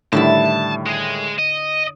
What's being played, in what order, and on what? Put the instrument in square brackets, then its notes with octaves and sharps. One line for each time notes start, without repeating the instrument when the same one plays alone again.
[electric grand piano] A2 D#3 G3 [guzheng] D3 D4 E4 [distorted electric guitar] A5
[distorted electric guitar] G#3
D#5